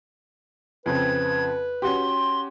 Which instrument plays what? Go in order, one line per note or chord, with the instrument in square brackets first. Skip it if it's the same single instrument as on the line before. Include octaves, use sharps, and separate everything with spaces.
[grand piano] F2 C#3 C4 [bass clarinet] B4 [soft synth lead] G#6
[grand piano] C#4 F#4 G4 [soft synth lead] C6